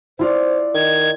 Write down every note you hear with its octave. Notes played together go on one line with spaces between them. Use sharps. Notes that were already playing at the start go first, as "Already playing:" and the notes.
E4 F4 C5 D5
D#3 D#5 G#6